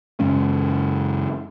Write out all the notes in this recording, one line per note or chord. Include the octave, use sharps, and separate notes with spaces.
F#2 C#3 G#3 C#4